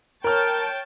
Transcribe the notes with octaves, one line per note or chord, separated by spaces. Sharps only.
A#4 C#5 G5 A5 F6